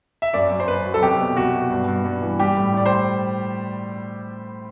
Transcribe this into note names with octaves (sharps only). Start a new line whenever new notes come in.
E5
F#2 D5
F#2
C5
F#2 B4
F#3
A4
C2 G4
B2
C2 F#4
B2
G2
G2
G2
E3
G3 G4
A2
A2 D5
C5